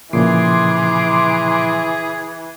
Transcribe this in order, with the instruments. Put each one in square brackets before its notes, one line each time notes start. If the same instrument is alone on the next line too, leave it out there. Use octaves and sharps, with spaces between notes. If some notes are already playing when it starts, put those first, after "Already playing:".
[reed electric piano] A#2 C#3 F3 [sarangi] E3 [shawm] G#4 [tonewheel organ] C6 D6